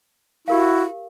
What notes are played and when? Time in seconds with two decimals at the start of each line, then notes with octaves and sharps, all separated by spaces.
0.48 E4 F#4 G4 A#4 F5